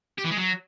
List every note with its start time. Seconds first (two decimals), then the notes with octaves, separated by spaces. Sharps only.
0.18 G4
0.25 E3
0.31 G#3
0.38 F#3